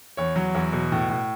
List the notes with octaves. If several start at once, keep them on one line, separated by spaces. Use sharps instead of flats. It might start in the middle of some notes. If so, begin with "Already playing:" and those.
E2 C#5
F#3
E2
B2
A2
A2